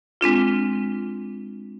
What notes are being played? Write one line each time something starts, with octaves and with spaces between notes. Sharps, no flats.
G#3 C4 D4 F4